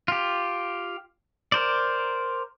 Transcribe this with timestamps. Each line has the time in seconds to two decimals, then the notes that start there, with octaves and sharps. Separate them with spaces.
0.08 F4 G4
1.52 A#4 C5 D5